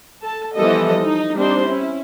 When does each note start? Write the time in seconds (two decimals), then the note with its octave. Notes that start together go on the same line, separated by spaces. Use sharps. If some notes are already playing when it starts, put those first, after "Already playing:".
0.23 A4 A5
0.55 E3 F3 G3 B3 A4 D#5
1.01 D#4
1.37 G3 C4 D4 D#4 C5
1.67 C#4 E4